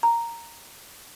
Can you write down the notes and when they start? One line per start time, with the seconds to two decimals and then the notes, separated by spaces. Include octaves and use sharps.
0.03 A#5